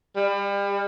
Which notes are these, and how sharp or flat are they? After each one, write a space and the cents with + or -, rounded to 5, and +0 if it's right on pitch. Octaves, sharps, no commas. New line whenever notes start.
G3 +35